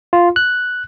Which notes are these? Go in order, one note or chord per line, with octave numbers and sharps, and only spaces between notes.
F4
F#6